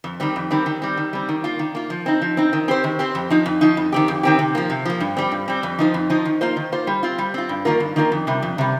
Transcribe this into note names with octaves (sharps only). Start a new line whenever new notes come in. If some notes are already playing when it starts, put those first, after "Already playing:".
F2
D#3 G3 C4
F2
D#3 G3 C4
D#3
G3 C4
D#3
G3 C4
D#3
A#3 F4
D#3
A#3 F4
F3
C4 D#4
F3
C4 D#4
D#3
C4 G4 C5
D#3
C4 G4 C5
F2
F3 D#4
F2
F3 D#4
F2
D#3 C4 G4
F2
D#3 C4 G4
C3
F3 A#3
C3
F3 A#3
G2
G3 C4
G2
G3 C4
F2
F3 D#4 C5
F2
F3 D#4 C5
D#3
A#3 F4 C5
D#3
A#3 F4 C5
G3
C4 F4
G3
C4 F4
G2
D#3 A#3 F4 A#4
G2
D#3 A#3 F4 A#4
F2
C3 G3
F2
C3 G3